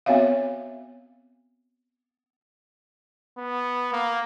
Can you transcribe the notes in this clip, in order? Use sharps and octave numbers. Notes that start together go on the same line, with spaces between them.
B3 C4 F#4 C#5 E5 F5
B3
A#3